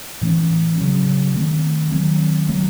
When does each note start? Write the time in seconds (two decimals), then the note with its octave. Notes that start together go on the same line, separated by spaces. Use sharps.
0.21 A2 E3 A3 C#4
0.78 C#3 F#3 C#4
1.34 D#3 A3 C4
1.92 D#3 F#3 C4
2.48 D#3 F#3 A3